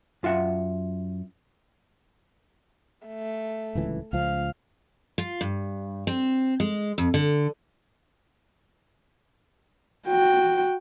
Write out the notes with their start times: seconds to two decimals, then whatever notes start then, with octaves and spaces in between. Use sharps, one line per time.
0.23 F#2 F4 E5 F#5
3.07 A3
3.75 D1 C#2 E3
4.13 C#2 F3 F5
5.18 F4
5.41 G2
6.07 C4
6.60 G#3
6.98 F2
7.14 D3
10.08 F#4 G5